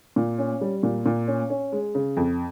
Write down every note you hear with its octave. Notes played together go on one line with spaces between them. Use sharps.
A#2
C#4
G3
A#2
A#2
C#4
C#4
G#3
C#3
F2